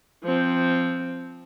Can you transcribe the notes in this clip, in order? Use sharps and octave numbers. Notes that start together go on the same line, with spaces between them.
F3 C4